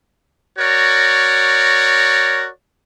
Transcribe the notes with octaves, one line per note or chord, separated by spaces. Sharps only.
F#4 A#4 C#5 D5